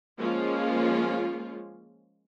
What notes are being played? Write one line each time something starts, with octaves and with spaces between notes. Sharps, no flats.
F3 G#3 A#3 C#4 F4